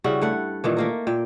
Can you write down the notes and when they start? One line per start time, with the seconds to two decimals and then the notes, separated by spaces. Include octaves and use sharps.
0.04 C#3 G3 E4 F#4
0.21 G2 A3 F#5
0.64 A#2 D#3 E3
0.77 A3 A#3 A#4
1.07 A#2 G5